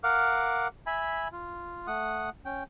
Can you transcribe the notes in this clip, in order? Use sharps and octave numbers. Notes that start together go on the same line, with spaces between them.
A#4 F5 F#5 D6
E5 G#5 B5
F4
A3 F#5 D#6
C#4 G5